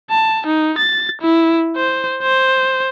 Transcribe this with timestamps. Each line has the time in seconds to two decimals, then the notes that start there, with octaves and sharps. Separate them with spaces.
0.11 A5
0.47 D#4
0.78 A6
1.22 E4
1.77 C5
2.23 C5